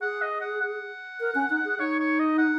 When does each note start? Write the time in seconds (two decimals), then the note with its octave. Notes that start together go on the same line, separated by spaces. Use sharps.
0.01 G#4 F#5
0.22 D#5
0.41 F#5
0.61 F#5
1.20 A#4
1.35 C#4
1.50 D#4
1.65 G#4
1.79 D#4 C#5
2.00 C#5
2.19 D#5
2.38 F#5